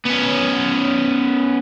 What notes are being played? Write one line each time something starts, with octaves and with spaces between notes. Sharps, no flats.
B3 C#4